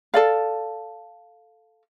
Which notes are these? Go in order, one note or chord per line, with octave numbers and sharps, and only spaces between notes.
A4 D5 F5